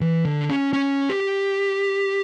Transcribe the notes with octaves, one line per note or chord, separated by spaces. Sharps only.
E3
D3
C#4
C#4
G4